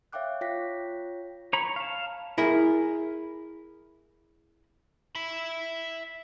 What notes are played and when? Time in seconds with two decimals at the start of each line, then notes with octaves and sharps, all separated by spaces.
0.13 C#5 E5 F5 G5 D6 F#6
0.41 F4 C#5 G5 A#6 B6
1.53 C#5 A#5 B5
1.76 F5 A5
2.38 E4 G#4 A#4
5.15 E5 B5